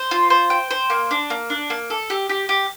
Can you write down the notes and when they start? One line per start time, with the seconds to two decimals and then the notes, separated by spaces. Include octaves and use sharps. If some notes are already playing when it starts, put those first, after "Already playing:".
Already playing: C5
0.11 F4
0.30 C5
0.50 G5
0.71 C5
0.90 A#3
1.11 D4
1.30 A#3
1.50 D4
1.70 A#3
1.90 A4
2.10 G4
2.29 G4
2.49 G4